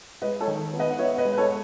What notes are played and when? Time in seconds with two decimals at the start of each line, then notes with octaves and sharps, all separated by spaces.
0.22 G#3 B4 D#5
0.41 A4 C#5
0.47 D#3
0.73 B3
0.79 B4 D#5
0.90 F#5
0.99 B3 C#5 E5
1.18 B4 D#5
1.25 G#3
1.33 B4
1.38 A4 C#5